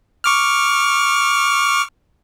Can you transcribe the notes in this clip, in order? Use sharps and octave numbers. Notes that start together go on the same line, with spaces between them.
C#6 D6 F6